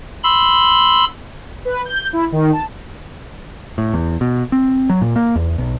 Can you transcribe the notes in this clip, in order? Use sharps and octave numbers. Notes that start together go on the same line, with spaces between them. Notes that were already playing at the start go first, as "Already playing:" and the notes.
B5 C6 E6
B4
G6
E4
D#3
A5
A2
E2
B2
C4
F#3
A#2
A#3
E2
B1